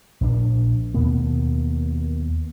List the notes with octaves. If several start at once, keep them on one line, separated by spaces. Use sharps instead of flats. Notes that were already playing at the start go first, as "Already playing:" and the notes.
A#1 C4 D4
D#2 B2 A#3 B3